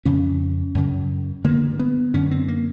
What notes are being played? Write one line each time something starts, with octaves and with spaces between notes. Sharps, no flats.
F2 C#3 C#4
F#2 C#3
G2 D3 A#3
B3
F#2 D3 C#4
C4
A#3